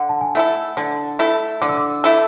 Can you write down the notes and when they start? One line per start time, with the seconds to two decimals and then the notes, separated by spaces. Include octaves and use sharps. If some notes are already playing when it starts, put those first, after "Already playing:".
Already playing: D3 F#5
0.09 A5
0.21 G#5
0.35 A3 E4 A4
0.77 D3 A5
1.19 A3 E4 A4
1.62 D3 D6
1.69 E6
1.77 D6
2.04 A3 E4 A4